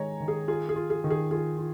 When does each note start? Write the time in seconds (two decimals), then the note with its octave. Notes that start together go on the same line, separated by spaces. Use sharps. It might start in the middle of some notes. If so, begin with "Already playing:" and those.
Already playing: D#3 G#3 D#4 C#5 G#5 A#5
0.20 D#3
0.28 G#4
0.48 F4 G#4
0.69 G#4
0.76 F4
0.90 G#4
1.04 D#3
1.10 G#4
1.31 F4 G#4
1.58 F4